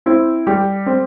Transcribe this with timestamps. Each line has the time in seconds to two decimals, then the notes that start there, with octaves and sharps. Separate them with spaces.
0.06 C4 E4
0.47 G3 G4
0.86 C4